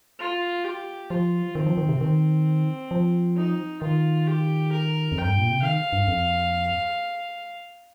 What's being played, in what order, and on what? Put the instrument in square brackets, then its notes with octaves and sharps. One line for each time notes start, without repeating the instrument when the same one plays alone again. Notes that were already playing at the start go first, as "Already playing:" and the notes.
[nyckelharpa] F4
G4
[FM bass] F3 [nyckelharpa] F4
[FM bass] D#3 [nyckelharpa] C4
[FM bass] F3
D#3
C3
[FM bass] D#3 [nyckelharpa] C4
[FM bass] F3
[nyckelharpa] D#4
[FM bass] D#3 [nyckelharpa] F4
[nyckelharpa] G4
A#4
[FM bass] F2
[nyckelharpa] G5
[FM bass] G2
A#2
C3
[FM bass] D#3 [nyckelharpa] F5
[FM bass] G2
F2